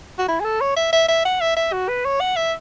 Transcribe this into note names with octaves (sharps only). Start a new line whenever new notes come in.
F#4
E4
G#4
A4
C#5
E5
E5
E5
F#5
E5
E5
F#4
B4
C#5
F#5
E5